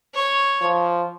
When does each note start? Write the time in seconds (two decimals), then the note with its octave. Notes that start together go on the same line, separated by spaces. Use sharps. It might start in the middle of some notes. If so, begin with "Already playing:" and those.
0.14 C#5
0.62 F3